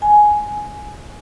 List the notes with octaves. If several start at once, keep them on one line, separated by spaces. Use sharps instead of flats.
G#5